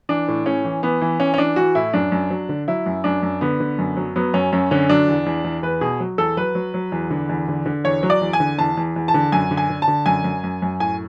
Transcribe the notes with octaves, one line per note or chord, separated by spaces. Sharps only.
E3 D4
A2
A2 C#4
E3
E3 B3
E3
E3 C#4
C#4
E3 D4
E3 F#4
A2 E4
F#2 D4
F#2
F#3
D3
F#3 E4
F#2
F#2 D4
F#2
D3 B3
D3
F#2
F#3
F#3 B3
F#2 C#4
F#2 C#4
D3 C#4
F#3 D4
E2
E2
E2
E2 B4
B2 G#4
F#3
E2 A4
F#3 B4
F#3
F#3
E2
D3
E2
D3
D3
E2 C#5
F#3
D5
E2
G#5
D3
E2 A5
E2
E2
A5
D3
F#2 G#5
D3
G#5
D3
A5
D3
F#2 G#5
F#2
F#2
F#2
A2 G#5